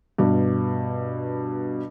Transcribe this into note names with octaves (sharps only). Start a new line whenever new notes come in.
G2 B2